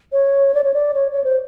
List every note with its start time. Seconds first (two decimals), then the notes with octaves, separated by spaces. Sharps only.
0.12 C#5
0.54 D5
0.64 C#5
0.74 D5
0.94 C#5
1.12 C#5
1.24 C5